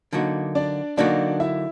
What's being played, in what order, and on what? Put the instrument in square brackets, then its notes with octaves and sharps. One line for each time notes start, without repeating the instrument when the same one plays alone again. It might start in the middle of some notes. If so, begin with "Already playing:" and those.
[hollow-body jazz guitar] D3 F#3 A#3 D#4 F#4
[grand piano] D4 D5
[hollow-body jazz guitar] D3 F#3 A#3 D#4 F#4 [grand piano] D4 D5
[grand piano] E4 E5